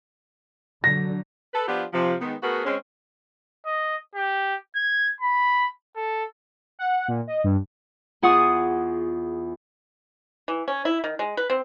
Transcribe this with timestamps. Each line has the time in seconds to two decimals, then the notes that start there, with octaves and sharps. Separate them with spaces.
0.84 D3 F#3 A#6
1.54 A4 B4
1.68 F3 B3 D4 F4 G4
1.93 C3 F3
2.21 D#3 G#3 B3
2.43 A3 B3 F#4 G#4 A#4 B4
2.65 G#3 C4 C#4
3.66 D#5
4.15 G4
4.76 G#6
5.21 B5
5.96 A4
6.79 F#5
7.08 A#2
7.27 D#5
7.44 G2
8.22 E2 F4 G#4 F#5 C#6 D#6
10.48 E3
10.68 C#4
10.85 E4
11.04 D#3
11.19 G#3
11.37 B4
11.50 C4